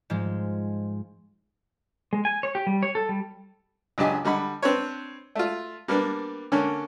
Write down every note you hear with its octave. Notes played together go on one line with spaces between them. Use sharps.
G#2 F3 G#3
G#3
G#5
C#5
G4
G3
C#5
A4
G3
C#2 F#3 D4 G4 D#5 G#5
D3 G3 D#5 F#5 B5
C4 D4 B4 C#5
A3 F4
G3 A#3 B3 D4
D3 A#3 C#4 D4